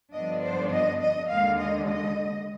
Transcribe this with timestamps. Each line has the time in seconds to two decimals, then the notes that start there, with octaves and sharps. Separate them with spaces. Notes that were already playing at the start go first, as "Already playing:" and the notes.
0.12 G2 D3 F3 B3 D4 D#5
0.42 C5
0.72 D#5
1.00 D#5
1.29 D#2 D3 G#3 F5
1.59 D#5
1.88 D#5